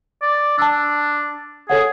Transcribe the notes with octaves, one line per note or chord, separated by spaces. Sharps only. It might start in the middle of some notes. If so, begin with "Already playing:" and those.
D5
D4 A5 E6
G#4 A4 C#5 F#5